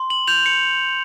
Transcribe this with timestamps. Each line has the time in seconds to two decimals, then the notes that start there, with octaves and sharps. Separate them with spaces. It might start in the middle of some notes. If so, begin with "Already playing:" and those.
Already playing: C6
0.10 F#7
0.27 G6 F7
0.46 C#7